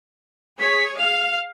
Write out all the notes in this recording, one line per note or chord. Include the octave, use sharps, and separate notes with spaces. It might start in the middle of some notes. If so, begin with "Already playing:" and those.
G#4 C#5 B6
F5 F7